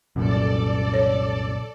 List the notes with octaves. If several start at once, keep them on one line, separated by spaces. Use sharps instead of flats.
C2 F#2 A#2 A4 D5
C#5